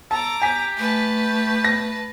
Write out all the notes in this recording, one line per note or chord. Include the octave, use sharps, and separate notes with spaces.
A4 A5 A#5 D6
G4 G#5 B6
A3 B4 A5
A#6